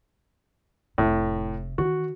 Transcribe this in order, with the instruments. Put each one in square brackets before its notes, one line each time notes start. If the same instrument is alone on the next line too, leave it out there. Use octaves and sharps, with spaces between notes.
[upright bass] F1 C3 [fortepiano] A2
[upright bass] D#3 E3 [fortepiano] F#4